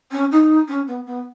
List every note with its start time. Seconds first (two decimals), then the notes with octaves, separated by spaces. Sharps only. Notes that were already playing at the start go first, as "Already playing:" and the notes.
0.11 C#4
0.31 D#4
0.68 C#4
0.87 B3
1.06 B3